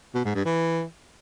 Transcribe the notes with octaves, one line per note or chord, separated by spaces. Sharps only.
B2
G#2
G2
E3